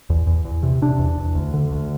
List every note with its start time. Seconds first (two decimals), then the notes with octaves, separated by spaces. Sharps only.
0.10 E2
0.27 E2
0.45 E2
0.63 C3
0.82 C3 D4
0.99 E2
1.18 E2
1.35 D2
1.54 D3
1.72 D2